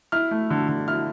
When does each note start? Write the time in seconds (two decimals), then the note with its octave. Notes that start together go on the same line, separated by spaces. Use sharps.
0.12 E4 F6
0.31 A3
0.50 D3
0.69 D3
0.88 E4 F6